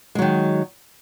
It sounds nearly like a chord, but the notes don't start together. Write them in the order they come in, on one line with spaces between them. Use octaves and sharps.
G#3 F#3 D#3